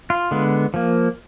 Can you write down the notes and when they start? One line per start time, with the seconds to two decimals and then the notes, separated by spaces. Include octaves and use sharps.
0.10 F4
0.31 D3 G#3 B3
0.74 F3 A#3